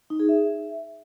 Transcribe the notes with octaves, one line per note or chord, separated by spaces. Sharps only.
D#4
G#4
E5